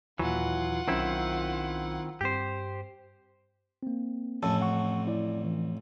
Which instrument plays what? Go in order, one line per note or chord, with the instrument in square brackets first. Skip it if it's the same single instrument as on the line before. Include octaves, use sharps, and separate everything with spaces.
[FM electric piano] D#2 A#2 [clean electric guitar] E3 F#3 [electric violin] F4 F#5
[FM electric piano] B1 F#3 C#4 [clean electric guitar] D#3 C4 E4
[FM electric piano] G2 C4 [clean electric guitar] G4 C5
[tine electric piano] A#3 C4
[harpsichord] A1 F2 C#4 [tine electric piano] A5 E6
[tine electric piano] F#5 C#6
E4 D5
E3